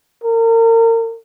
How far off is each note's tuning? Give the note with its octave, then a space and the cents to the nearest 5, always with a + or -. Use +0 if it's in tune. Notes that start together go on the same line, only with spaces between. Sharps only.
A#4 -35